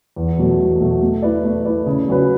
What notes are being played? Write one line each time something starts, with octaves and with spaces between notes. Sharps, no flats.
E2
B2 F#3 A3
E2
B2 F#3 A3
A3
E4 B4 D5
A3
E4 B4 D5
C#3
F#3 C#4 F#4 B4